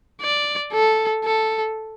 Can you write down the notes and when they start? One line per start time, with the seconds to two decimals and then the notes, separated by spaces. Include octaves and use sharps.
0.22 D5
0.72 A4
1.25 A4